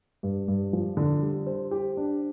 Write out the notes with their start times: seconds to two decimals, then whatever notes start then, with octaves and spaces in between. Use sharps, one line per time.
0.23 G2
0.48 G2
0.73 F3
0.97 D3
1.22 G3
1.47 C5
1.71 G4
1.97 D4